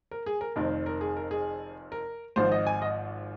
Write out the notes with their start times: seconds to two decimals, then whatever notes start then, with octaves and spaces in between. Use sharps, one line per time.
0.11 A#4
0.26 G#4
0.41 A#4
0.56 F1 F2 D#3 A#4
0.86 A#4
1.01 G#4
1.17 A#4
1.31 G#4
1.92 A#4
2.36 G#1 G#2 F3 C5
2.52 D#5
2.67 G#5
2.82 D#5